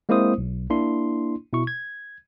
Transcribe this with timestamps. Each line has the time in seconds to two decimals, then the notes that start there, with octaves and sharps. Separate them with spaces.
0.09 G#3 A#3 C4 E4 C5 D#6
0.38 B1
0.70 A#3 D4 E4 C6
1.53 B2 E4 C#6
1.67 G#6